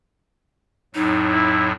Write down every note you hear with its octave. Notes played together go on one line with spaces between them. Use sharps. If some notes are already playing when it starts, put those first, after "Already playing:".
F2 A2 F#3 D#4
E4